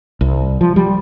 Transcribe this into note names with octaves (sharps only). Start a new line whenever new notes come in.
C2
F3
G3